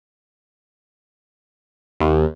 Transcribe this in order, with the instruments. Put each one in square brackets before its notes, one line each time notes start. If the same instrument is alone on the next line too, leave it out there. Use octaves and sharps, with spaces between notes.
[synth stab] D#2